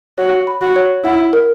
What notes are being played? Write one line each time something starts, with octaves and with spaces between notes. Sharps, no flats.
F#4 C#5
B5
F#4
C#5
E4 F#5
A#4